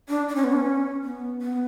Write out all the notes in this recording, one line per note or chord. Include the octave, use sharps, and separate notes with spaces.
D4
D4
C#4
B3
D4
C#4
B3
B3